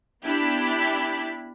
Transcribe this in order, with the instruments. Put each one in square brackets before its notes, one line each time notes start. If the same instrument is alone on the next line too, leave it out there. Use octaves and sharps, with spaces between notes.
[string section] B3 D4 E4 G4 B5